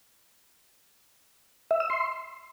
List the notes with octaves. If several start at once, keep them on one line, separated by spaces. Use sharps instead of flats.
E5
E6
C6